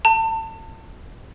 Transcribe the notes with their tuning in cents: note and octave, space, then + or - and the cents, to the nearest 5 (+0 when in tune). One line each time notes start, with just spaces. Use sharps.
A5 +30